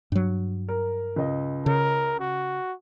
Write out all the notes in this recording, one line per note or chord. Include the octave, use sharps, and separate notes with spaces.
G2 F#3
A#4
C#2 D#5
C#3 A#4
F#4